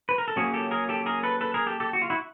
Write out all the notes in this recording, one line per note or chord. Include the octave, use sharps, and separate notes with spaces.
B4
A#4
A4
C#3 F#3 A#3 C#4 F#4 G#4
G4 A4
G#4 A#4
G4 A4
G#4 A#4
A4 B4
A4 B4
G#4 A#4
G4 A4
G4 A4
F#4
F4
E4 F#4